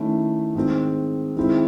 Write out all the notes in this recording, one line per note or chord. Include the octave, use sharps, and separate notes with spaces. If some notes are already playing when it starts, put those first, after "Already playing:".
Already playing: D#3 A3 C#4 E4
G#2 D#3 G#3 C4
D#3 G#3 C4 E4